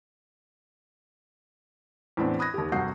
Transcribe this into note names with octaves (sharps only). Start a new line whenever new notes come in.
E2 A2 C4 D4
B5 D#6 F#6 G#6 A#6
D#2 G4
F1 G2 F#4 D#6 G6 C7